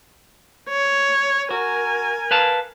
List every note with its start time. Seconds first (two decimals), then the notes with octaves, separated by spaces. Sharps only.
0.69 C#5
1.51 F#4 A#4 G#5
2.31 B4 F5 A5